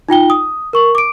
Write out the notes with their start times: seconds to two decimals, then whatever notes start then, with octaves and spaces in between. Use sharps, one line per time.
0.09 D#4 F4 G5 G7
0.30 D#6
0.73 A#4 C#6 F#7
0.95 D6 D7